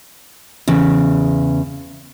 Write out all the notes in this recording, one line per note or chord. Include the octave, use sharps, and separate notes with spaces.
E2 C#3